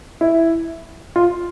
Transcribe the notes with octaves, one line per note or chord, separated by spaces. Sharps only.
E4
F4